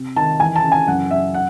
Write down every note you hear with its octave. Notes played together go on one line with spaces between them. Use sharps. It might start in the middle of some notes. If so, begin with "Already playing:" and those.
Already playing: C3
D#3 A5
E3 G#5
A5
C#3
G#5
F#2 F#5
F#2 E5
F#5